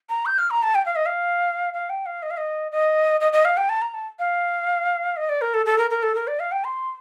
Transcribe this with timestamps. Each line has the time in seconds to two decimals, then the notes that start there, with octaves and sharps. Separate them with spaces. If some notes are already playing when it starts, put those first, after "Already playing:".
0.09 A#5
0.26 G6
0.38 F6
0.50 A#5
0.63 A5
0.75 G5
0.86 F5
0.96 D#5
1.06 F5
1.73 F5
1.90 G5
2.06 F5
2.22 D#5
2.30 F5
2.37 D#5
2.72 D#5
3.21 D#5
3.33 D#5
3.45 F5
3.57 G5
3.69 A5
3.82 A#5
3.94 A5
4.19 F5
5.17 D#5
5.29 D5
5.41 A#4
5.54 A4
5.66 A4
5.78 A#4
5.90 A#4
6.03 A4
6.15 A#4
6.27 D5
6.40 F5
6.52 G5
6.64 C6